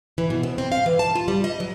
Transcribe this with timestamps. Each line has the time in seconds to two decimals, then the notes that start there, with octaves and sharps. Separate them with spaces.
0.18 E3
0.30 B2
0.43 F2
0.58 C4
0.72 F5
0.86 E3
0.99 A5
1.15 F4
1.28 G3
1.44 D#5
1.60 F#3